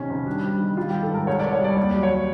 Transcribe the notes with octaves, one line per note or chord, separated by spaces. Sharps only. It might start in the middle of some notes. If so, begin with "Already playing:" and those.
Already playing: C3 D#3 C#4
F2
G3 D4
G3
D#3
G3 F4
D#3 G4
A4
G#2 A#4
C2 C#5
C2 D5
C#5
G3 D5
D#2 D5
F#3
C#5